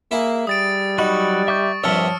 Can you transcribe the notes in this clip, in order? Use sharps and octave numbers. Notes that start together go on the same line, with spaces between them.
A#3 E4 G#4
G3 D#6 A6 D7
F#3 D#4 F#4 B5
E5 C#6 D6 G6
A#1 G2 C3 C#5 A5 E6 F6 C#7